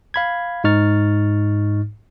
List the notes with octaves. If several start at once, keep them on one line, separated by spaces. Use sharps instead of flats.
F5 B5 G#6
G#2 D#4 C#6 F6 A6